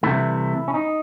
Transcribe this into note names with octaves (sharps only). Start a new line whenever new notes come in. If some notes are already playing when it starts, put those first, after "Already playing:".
C2 C3 E3 A3 E4
C#4
D#4